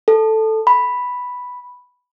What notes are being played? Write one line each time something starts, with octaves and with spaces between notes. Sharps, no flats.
A4
B5